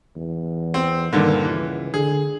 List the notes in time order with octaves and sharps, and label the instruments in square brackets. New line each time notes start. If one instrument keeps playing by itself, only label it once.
[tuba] E2
[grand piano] C4
[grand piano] G2 A#2 D3 [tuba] D#3
[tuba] C#2 [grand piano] E3
[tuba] D3 [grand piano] G#4